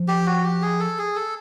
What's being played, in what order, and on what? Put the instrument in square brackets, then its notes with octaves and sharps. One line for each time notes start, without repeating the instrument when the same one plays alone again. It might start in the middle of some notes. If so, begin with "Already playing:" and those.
Already playing: [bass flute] F3
[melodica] G4
F#4
G4
G#4
A4
G#4
A4